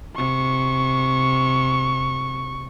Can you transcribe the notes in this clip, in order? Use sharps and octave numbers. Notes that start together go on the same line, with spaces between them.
C3 C#6